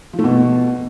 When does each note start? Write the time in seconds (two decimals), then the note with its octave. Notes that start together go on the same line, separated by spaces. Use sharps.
0.13 F3
0.19 A3
0.24 B2